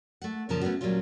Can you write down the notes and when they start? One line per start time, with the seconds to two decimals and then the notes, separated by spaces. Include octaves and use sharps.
0.22 A3 F#5
0.49 F2 A#2 C#3 F3 A#4 A5
0.62 A3 B3 C#4 D4 F#4
0.81 D2 A#2 F#3 G3 C#4 F4